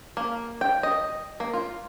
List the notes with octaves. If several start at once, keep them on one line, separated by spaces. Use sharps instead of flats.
A#3
G5
D#5
A#3
F4